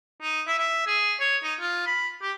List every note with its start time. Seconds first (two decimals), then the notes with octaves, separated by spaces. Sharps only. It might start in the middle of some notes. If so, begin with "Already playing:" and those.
0.22 D#4
0.47 E5
0.59 E5
0.87 G#4
1.20 C#5
1.44 D#4
1.60 F4
1.87 B5
2.22 G4